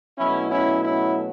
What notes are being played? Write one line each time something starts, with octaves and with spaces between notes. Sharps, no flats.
B2 F#3 A3 C#4 E4
C#4 E4
C#4 E4